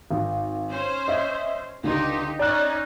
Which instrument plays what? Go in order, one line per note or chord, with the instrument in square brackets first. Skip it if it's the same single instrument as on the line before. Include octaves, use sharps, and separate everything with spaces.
[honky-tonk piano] G#1
[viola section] C#4 C5
[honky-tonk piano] D#5 E5
[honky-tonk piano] C#2 D3 C6 [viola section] D#4 G4
[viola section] C#4 D#4 [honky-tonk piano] D5 A#5 F#6